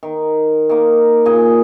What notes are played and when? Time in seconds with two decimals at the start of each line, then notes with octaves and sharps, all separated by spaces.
0.03 D#3
0.69 D#3 A#3
1.25 A#2 C#3 D#5 G#5